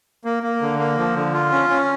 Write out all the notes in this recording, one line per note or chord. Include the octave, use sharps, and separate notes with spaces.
A#3
A#3
D3
A#3
F3
D3
F4
C#4
C#4